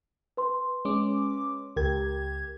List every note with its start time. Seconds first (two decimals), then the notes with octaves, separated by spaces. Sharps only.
0.37 B4 C6
0.85 G#3 C#4 D6
1.76 C#2 G4 A#4 G#6